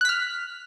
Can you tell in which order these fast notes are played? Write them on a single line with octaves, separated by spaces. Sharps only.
F#6 B6 F6